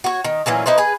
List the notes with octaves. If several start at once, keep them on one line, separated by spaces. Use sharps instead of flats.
F#4 C#5
D#3
A#2 E3 F#3 C#4
D#4 E4 B4 C5
G#4 B4